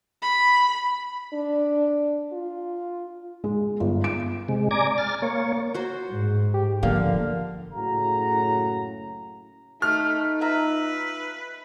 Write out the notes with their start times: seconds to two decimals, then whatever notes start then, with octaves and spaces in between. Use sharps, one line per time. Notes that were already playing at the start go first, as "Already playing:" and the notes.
0.22 B5
1.33 D4
2.32 F4
3.44 G#3
3.80 G1
4.04 D7
4.49 C3 G#3
4.71 D5 G#5 A#5 D6
4.98 F6 A6
5.22 A#3 C#5
5.74 F#4 C5
6.11 G#2
6.54 G4
6.83 D3 F3 A#3 F5
7.74 F#1 A2 C#3 F#4 A#5
9.82 A3 D#4 F6
10.41 F4 B4 E5 A#5